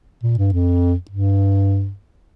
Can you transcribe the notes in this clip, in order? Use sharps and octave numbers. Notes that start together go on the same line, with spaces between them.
A#2
G2
F2
G2